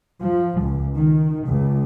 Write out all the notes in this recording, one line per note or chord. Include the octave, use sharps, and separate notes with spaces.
F3
C#2
D#3
C#2